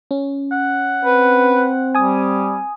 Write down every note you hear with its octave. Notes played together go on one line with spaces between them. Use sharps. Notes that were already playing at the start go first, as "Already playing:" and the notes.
C#4
F#5
C4 B4
G3 G#5 D#6